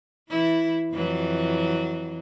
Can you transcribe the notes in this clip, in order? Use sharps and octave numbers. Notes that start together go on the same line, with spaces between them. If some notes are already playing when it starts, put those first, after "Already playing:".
E3 E4
F2 E3 F#3